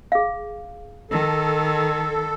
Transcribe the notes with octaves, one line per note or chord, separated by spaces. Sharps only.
G#4 F5
D#3 A4